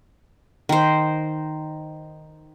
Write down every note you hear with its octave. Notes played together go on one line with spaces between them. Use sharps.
D#3 C5